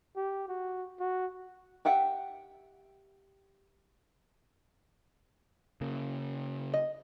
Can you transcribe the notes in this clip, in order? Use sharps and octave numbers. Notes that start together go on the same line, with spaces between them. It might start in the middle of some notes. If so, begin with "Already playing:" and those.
G4
F#4
F#4
G4 E5 F#5 G5
C#3 A#3
D#5